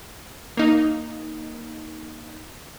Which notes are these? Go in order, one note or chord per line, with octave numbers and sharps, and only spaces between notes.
A#3 D#4